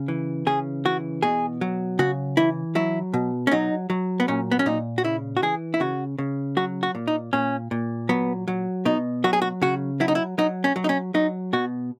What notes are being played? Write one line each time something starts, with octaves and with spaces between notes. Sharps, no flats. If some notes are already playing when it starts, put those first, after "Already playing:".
Already playing: C#3
E3
C#3 G#4
E3 F#4
B2 G#4
F#3
C#3 F#4
E3 E4
F#3 E4
B2
C#4
F#3 D#4
F#3
B3
A#2 C#4
B3
C#4
A#2 D#4
F#4
C#3 E4
F#4
E3 G#4
E4
C#3 F#4
C#3
F#3 F#4
F#4
A#2
D#4
A#2 C#4
A#2
F#3 B3
F#3
B2 D#4
F#3 F#4
G#4
F#4
C#3 F#4
F#3 E4
D#4
E4
F#3 D#4
C#4
F#3
D#4
C#4
F#3 D#4
B2 F#4